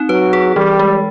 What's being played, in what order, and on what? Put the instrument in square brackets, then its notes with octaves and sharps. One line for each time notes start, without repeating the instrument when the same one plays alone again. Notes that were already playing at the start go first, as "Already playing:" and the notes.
Already playing: [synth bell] C4 D#4
[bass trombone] F#3 [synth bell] B4
[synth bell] G#4
[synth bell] E3 [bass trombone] G3
[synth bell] G#3